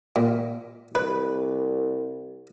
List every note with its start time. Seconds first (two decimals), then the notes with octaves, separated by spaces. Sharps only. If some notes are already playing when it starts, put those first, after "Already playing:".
0.16 A#2
0.95 C2 B4